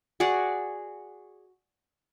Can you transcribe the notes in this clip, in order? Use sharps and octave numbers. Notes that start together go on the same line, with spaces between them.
F#4 G#4 D5 F#5